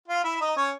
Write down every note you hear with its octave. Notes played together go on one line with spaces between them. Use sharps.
F4 F5
E4 E5
E5
D#4 D#5
C#4 C#5